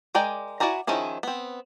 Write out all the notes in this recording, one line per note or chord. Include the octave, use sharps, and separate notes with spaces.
G#3 A#4 D5 G5 G#5
E4 F#4 D5 G#5 A#5
D#3 F3 C#4 E4 G#4
B3 C4